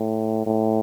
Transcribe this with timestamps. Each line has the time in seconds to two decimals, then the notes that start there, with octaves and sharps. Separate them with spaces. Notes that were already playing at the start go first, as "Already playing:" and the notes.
Already playing: A2
0.46 A2